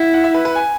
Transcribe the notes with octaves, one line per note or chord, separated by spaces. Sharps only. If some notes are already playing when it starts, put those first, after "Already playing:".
Already playing: E4 F#5
F#5
E5
B4
B4
G#5